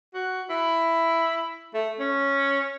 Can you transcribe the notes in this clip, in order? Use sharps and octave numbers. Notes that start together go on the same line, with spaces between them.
F#4
E4
A3
C#4